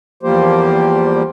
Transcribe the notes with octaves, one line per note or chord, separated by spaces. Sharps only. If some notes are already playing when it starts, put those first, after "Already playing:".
E2 F3 G3 A#3 G4 C5